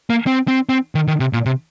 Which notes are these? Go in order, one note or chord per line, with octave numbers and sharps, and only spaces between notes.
A#3
C4
C4
C4
D#3
D#3
C3
A#2
C3